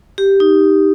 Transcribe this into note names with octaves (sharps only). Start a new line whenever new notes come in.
G4
D#4